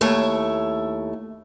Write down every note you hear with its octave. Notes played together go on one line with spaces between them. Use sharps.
D#2 A3 E4 C#5